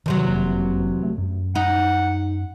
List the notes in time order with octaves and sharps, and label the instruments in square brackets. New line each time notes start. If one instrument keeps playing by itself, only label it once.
[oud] E2 C3 F#3 [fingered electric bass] D#3
[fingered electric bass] F1 A#3
A3
F#2
[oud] D#4 [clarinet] F#5